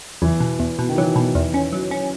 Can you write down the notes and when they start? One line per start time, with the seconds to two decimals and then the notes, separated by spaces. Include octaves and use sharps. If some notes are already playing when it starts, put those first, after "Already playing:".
0.22 E2 E3
0.40 B2
0.60 E2
0.79 B2
0.89 D#3
0.98 E3 F#3
1.16 B2
1.35 E2
1.54 C#4
1.73 F#3
1.91 C#4